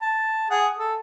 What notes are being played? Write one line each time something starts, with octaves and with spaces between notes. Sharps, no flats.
A5
G#4 F#5
A4